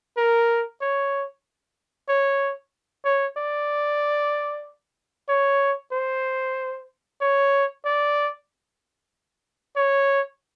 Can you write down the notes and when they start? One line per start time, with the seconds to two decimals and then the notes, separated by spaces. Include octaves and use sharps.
0.17 A#4
0.81 C#5
2.09 C#5
3.05 C#5
3.37 D5
5.29 C#5
5.92 C5
7.21 C#5
7.85 D5
9.76 C#5